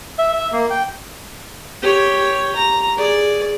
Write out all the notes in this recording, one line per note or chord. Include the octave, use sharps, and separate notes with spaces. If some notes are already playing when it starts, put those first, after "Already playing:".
E5
E5
A#3
G5
G4 C#5
A#5
G#4 D5